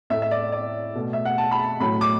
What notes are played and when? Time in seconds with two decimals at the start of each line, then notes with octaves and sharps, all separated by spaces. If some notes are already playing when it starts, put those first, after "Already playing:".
0.10 A2 E5
0.14 A3
0.22 E5
0.31 D5
0.52 D5
0.95 B2 A3
1.13 E5
1.25 F#5
1.38 A5
1.51 B5
1.59 A5
1.80 A2 F#3 A3 B5
2.01 D6